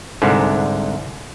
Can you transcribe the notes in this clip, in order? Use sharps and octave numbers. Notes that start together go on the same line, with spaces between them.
C2 G#2 D3